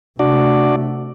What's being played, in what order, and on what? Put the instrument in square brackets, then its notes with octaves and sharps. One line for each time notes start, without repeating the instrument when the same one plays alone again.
[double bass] C3 A3 [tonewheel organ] D4 F#4 D5